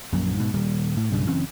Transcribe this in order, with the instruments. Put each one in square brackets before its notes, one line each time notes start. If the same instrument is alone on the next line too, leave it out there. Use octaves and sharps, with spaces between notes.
[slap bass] A#1 F#2 A#2
G#2 B2
D#1 G3
A2
B1 G2 C#3 G3
F#1 E3 C4 C#4